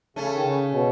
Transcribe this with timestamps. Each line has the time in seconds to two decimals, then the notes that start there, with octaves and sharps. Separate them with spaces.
0.16 C#3 A3 C#4
0.34 D#3
0.44 C#3
0.73 B2